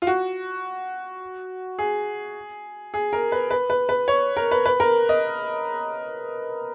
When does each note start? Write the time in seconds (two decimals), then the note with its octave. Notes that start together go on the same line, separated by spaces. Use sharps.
0.02 F4
0.07 F#4
1.79 G#4
2.94 G#4
3.13 A#4
3.32 B4
3.51 B4
3.70 B4
3.89 B4
4.08 C#5
4.37 A#4
4.51 B4
4.66 B4
4.80 A#4
5.09 D#5